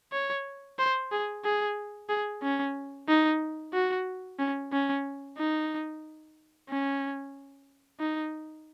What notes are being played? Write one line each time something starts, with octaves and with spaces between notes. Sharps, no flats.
C#5
C5
G#4
G#4
G#4
C#4
D#4
F#4
C#4
C#4
D#4
C#4
D#4